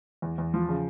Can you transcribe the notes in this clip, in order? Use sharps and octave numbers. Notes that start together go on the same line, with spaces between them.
E2
E2
F3
C#3